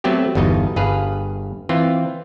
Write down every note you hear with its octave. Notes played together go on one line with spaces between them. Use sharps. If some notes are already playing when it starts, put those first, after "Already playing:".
F#3 A3 B3 C4 G4
G1 E2 B2 D#4 D#5
G1 G2 G#4 B4 F5
E3 C4 F4